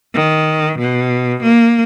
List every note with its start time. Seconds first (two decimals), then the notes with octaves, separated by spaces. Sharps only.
0.14 D#3
0.79 B2
1.42 A#3